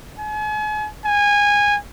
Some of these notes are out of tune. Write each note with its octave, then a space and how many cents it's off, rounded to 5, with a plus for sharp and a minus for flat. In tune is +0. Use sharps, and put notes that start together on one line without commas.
G#5 +40
G#5 -20